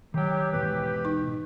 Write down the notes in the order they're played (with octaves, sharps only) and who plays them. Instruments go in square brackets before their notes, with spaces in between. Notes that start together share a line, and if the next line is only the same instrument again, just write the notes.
[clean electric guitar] D#3 G5 [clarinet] F#3 [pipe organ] G4
[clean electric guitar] E2 G#2 B2 [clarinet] B4
[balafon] D#4